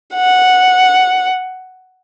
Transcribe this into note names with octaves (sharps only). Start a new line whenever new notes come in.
F#5